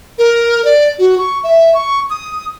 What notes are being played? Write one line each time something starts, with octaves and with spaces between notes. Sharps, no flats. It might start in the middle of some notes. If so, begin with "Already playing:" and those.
A#4
D5
F#4
C#6
E5
C#6
D#6